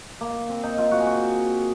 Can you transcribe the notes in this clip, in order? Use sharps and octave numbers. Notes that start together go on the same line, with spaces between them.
A#3
C4
D#4
F4
F#4
G#4
F#4